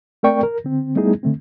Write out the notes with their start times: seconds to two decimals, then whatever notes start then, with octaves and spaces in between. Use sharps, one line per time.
0.23 A3 C4 A#4 D5 G5 C#6
0.43 A#4
0.64 D3 C4
0.96 G3 A3 B3 D#4 E4 G#4
1.23 D3 A3 C4